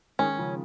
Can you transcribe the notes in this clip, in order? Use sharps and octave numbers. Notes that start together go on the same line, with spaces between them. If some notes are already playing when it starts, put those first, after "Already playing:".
D#3 G#3 C#4
C#3 F3